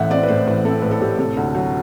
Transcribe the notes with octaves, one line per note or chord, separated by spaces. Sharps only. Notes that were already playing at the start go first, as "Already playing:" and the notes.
Already playing: A1 A2 E5 F#5
C4 D5
B4
A2 C5
A1 B4
C4 A4
A2 B4
A4
A2 G4
C3 A4
D2
F#3